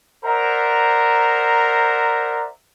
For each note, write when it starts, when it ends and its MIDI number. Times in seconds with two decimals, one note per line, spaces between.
0.25 2.47 70
0.25 2.47 72
0.25 2.47 74
0.25 2.47 76
0.25 2.47 78
0.25 2.47 82